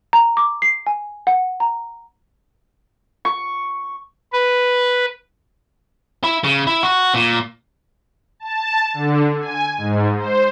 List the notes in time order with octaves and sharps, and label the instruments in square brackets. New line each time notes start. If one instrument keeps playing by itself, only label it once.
[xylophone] A#5
D6
C7
G#5
F#5
A#5
[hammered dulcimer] C#6
[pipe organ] B4
[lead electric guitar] E4
C#3
E4
F#4
A#2
[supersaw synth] A5
D3
G#5
G#2
C5